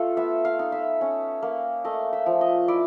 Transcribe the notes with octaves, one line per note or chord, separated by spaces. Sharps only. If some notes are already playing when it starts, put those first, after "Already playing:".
Already playing: A3 F4 A4
B3 E5
F5
D#4
E5
C#4
A#3
A3 D#5
E5
F3
D#5
E4 D5